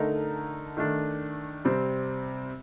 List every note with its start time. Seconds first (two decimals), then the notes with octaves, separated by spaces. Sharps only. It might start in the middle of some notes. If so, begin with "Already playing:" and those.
Already playing: D3 A3 D#4 A#4
0.77 D#3 A3 D4
1.65 C3 G3 C4